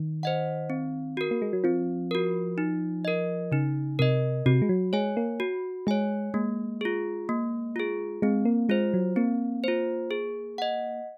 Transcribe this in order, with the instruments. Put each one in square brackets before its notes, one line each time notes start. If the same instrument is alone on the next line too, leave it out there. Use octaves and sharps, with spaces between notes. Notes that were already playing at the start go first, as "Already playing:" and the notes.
Already playing: [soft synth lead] D#3
[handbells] C5 D#5 F#5
C4
F#4 A#4
[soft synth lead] A#3
G#3
F#3
[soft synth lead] F3 [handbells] C4
[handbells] F#4 A#4
D#4
A#4 D#5
[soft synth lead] C#3 [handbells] D#4
[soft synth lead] C3 [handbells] A#4 D#5
[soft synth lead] C3 [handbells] F#4
[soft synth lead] G#3
F#3
[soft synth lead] G#3 [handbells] C#5 G#5
[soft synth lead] A#3
[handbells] F#4
[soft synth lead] G#3 [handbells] C#5 G#5
[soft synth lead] G#3 [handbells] A#3
[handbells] F4 G#4
A#3
F4 G#4
[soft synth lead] G#3 [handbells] C4
[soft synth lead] A#3
[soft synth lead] G#3 [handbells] F4 C5
[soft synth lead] F#3
[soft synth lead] A#3 [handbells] C4
[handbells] F4 C5
G#4
D#5 F#5